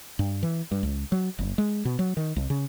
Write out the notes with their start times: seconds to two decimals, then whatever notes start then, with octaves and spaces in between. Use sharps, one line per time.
0.19 G2
0.43 E3
0.71 G2
0.83 C#2
1.12 F#3
1.39 F#1
1.58 G#3
1.85 B2
1.99 F#3
2.17 D#3
2.36 C2
2.50 C#3